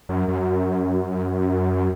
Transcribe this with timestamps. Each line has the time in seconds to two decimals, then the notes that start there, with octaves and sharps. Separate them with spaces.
0.09 F#2
0.28 F#2